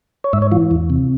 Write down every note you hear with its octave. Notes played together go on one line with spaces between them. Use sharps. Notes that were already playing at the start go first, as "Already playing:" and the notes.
C#5
G#2 E5
C#5
E3 F4
E2
C3